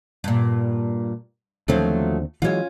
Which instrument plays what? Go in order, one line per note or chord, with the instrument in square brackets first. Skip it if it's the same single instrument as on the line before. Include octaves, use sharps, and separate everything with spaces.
[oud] G2 A#2
[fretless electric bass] D#2 D3 C4 [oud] F3 F#3 A3
[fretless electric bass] E3 F#3 G#3 [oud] C#4 F4